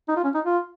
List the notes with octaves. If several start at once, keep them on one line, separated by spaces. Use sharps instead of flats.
D#4
F4
C#4
D#4
F4